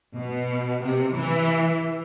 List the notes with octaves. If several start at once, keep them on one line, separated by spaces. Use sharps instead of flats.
B2
C3
E3